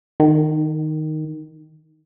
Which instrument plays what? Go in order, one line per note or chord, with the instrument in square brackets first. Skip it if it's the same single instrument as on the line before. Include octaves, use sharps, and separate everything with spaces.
[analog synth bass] D#3